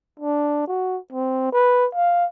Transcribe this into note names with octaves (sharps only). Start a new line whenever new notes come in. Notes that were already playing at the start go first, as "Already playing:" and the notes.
D4
F#4
C4
B4
F5